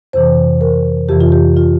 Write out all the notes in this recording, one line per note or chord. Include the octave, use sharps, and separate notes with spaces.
F2 C3 E3 C5
A#4
F2 C3 E3 G4
F4
G4
F4